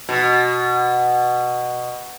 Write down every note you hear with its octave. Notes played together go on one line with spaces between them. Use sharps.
B2